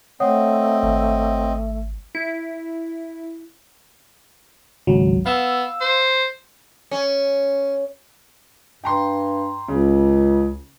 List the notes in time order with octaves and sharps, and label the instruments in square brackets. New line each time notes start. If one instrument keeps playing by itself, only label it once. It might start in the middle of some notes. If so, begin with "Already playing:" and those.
[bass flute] A3 [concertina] C4 D#5 [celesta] C#5 F#5 D#6
[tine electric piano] G#1
[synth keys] E4
[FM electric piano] G#1 C#2 F#3
[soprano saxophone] B3 [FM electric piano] F5 E6
[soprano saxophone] C5
[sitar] C#4
[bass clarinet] G2 [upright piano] G5 A#5 C6
[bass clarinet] C#2 [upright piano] C#3